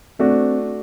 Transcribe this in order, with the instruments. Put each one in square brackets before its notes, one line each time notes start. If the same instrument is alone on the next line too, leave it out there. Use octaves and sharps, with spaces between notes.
[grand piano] A3 D4 F#4 [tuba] C4